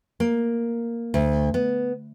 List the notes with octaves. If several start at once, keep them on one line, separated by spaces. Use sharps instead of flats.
A#3
D2
B3